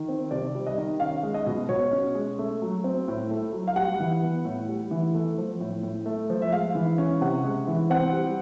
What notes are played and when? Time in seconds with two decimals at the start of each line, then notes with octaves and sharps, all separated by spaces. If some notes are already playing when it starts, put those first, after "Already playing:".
Already playing: D#3
0.09 C4
0.31 C3 D5
0.55 G3
0.67 D#5
0.78 D#3
1.00 C#4 F5
1.23 G#3
1.34 D#5
1.46 B2
1.69 B2 C#5
1.92 C#4
2.15 G#3
2.39 A3
2.62 F#3
2.84 C4
3.08 A2
3.31 A3
3.53 F#3
3.68 F5
3.76 G3 F#5
4.00 E3
4.22 B3
4.45 A2
4.68 G3
4.91 E3
5.14 A3
5.38 F3
5.60 A2
5.83 A2
6.06 A3
6.30 F3
6.42 E5
6.52 G#3 F5
6.75 E3
6.98 C#4
7.21 C3 F#5
7.44 G#3
7.67 E3
7.90 C4 F#5
8.13 G3